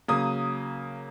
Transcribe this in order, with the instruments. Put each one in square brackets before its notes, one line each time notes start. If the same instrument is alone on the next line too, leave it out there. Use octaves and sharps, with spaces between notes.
[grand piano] C#3 F#3 A#3 D#6